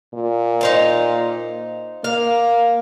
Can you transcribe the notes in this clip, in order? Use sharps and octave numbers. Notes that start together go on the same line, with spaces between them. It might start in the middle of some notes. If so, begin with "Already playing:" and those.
A#2
D#4 C5 F5
A#3 F5